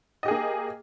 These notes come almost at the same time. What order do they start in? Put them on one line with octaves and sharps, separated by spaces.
D#5 G4 G#4 A#3